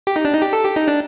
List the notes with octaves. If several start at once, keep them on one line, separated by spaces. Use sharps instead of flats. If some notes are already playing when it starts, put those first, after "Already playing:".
G4
D#4
D4
D#4
G4
A4
G4
D#4
D4